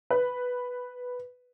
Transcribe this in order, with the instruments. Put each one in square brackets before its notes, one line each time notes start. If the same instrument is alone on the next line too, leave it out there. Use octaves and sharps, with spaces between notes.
[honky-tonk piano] B4